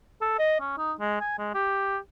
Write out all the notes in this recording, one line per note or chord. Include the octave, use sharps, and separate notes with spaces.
A4
D#5
C#4
D#4
G#3
G#5
G#3
G4